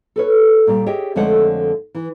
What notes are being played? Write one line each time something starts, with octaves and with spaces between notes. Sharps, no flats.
A4 B4 C#5
A#2 G3
G4 G#4 C#5 D#5 E5 G5
F2 D3 G#3 A3 C#5 F#5
E3